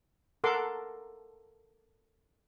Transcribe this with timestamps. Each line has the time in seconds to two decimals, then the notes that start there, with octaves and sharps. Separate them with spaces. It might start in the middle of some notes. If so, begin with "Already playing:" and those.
0.44 A4 A#4 F#5 C6 D6